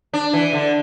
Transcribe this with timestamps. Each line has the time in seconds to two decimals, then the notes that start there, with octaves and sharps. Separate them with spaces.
0.13 D4
0.33 E3
0.53 D3